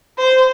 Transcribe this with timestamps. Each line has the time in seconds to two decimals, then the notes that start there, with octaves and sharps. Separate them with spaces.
0.18 C5